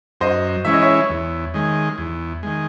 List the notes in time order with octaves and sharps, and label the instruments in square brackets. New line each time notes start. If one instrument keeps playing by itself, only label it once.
[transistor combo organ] F#2 [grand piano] C5 D#5
[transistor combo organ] E3 G#3 C#4 E4 [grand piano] E5
[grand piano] D#5
C#5 E5
[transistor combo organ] E2
D#3 G#3
E2
D#3 G#3